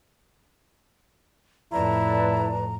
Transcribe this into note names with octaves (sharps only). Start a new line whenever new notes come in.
F2 A2 E4 B4 D5 A5 A#5